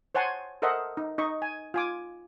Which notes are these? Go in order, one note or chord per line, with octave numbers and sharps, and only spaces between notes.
C5 C#5 F#5 G#5 A5 C6
A4 A#4 C5 D#5 E5 F#5
D#4
D#4 D#5 C#6
G#5
F4 G#5 D6